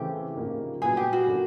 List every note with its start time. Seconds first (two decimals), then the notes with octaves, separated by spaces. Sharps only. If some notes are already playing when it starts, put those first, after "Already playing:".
Already playing: C#3 E3 A3 C4 G4
0.36 C#3 F3 A#3 D#4
0.82 A#2 F#3 B3 G#4
0.97 G4
1.13 F#4
1.27 D3 F#3 A#3 C#4 F4